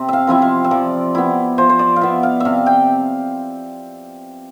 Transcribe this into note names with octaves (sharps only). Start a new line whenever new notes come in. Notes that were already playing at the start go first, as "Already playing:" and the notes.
Already playing: C3 C4
E5 F5
F3 C4 E4 E5
F5
E5
F3 D5
B3 E4
F3 C5
C5
D5
F5
B3 E4 E5
F5
C3 E5 F5
G5